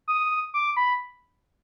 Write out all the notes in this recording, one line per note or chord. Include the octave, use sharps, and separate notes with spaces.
D#6
D6
B5